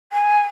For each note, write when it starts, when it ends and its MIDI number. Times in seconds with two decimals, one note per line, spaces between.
0.12 0.42 80